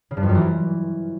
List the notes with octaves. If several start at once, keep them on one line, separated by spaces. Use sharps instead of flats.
C#3
G2
F2
F#2
E3